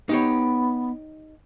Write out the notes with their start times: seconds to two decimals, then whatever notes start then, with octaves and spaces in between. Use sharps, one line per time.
0.09 B3 D#4 G4 C#5